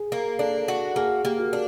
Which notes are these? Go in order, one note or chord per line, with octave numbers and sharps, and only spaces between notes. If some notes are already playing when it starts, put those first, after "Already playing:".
Already playing: G#4
A#3
D4 A4
F#4
A#3 G#4
A#3 G4
F#4
D4